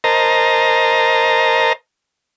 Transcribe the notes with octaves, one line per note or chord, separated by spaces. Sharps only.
A#4 C5 D#5 A5 A#5